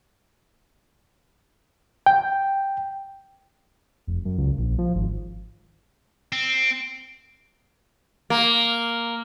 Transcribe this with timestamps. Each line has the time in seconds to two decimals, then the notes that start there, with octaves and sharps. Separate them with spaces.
2.06 G5
4.07 F1
4.25 F#2
4.38 C#2
4.58 A#1
4.79 F3
4.96 G#1
6.32 C4
8.30 A#3